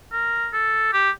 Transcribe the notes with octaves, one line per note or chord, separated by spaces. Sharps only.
A#4
A4
G4